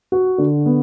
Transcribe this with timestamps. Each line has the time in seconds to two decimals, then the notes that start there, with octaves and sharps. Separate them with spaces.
0.12 F#4
0.38 D3
0.66 B3